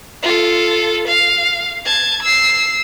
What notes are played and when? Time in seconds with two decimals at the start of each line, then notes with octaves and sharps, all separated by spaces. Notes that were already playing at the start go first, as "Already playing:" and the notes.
0.23 F4 A4
1.08 F5
1.85 A5 G#6
2.23 E6 C7